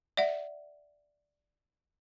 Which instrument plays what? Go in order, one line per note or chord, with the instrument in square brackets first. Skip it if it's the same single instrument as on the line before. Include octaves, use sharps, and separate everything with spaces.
[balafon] D5 E5 F#5